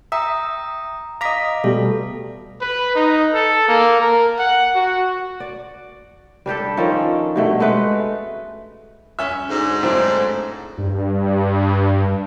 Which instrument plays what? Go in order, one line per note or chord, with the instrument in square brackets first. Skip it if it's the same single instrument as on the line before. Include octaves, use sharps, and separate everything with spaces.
[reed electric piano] E5 [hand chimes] G5 A#5 D#6
[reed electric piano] D#5 A#5 [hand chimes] F5 D6 B6
[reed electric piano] B2 G3 A3 [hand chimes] A4
[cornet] B4
D#4
A4
A#3
A#4
F#5
F#4
[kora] D5
G3 D4 G4 A4
D#3 F3 C#4 A4
G2 B2 A3
G#3 A3 B4 F#5
[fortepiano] C#4 E5
[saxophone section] D2 G#2
[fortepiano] A2 F#3 C4
[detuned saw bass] G2